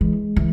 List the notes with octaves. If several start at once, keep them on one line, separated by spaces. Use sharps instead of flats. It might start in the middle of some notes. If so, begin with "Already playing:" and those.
E3 G#3
E3